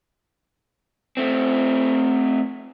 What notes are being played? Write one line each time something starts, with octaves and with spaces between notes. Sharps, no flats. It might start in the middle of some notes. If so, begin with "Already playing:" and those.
A3 C4